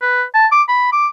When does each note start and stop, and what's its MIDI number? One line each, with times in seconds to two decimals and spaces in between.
0.02 0.23 71
0.34 0.46 81
0.52 0.62 86
0.68 0.90 83
0.92 1.07 86